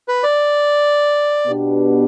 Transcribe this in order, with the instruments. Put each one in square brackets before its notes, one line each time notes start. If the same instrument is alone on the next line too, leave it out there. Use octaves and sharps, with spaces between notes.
[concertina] B4
D5
[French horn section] B2 B3 D4 G4 B4